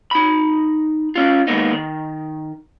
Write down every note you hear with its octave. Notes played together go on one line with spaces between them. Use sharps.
D#4 B5
C#4 F4
D#3 G#3 A#3 B3 D#4
D#3